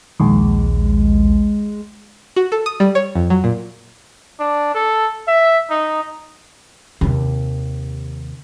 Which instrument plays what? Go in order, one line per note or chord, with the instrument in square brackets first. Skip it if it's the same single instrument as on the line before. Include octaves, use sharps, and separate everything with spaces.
[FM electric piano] A#1 D#2 [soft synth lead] G#3
[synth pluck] F#4
A4
D#6
G3
C#5
F2
F#3
A#2
[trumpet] D4
A4
E5
D#4
[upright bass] D#2 C3